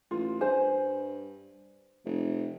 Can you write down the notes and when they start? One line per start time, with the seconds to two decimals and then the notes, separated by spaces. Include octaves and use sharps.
0.11 A1 F4
0.41 G2 C5 G#5
2.05 F1